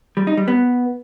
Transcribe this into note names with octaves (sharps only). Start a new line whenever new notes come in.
G3
D#4
G3
B3